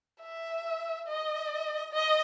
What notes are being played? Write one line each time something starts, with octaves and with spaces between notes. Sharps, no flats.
E5
D#5
D#5